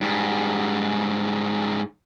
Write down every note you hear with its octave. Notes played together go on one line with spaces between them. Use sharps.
G#2 G3